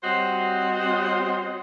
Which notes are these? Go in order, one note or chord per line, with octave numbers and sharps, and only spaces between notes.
G3 C4 F#4 C5 C#5 D#5